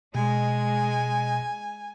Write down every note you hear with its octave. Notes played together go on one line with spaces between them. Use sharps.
B2 G#3 G#5